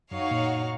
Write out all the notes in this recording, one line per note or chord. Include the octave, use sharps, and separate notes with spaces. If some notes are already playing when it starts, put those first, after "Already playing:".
F#2 D#4 F#4 C#5 F5
A#2